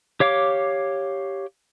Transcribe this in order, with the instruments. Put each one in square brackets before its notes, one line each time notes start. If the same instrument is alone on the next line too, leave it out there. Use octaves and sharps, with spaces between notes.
[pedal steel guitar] G4 C#5 F5 D6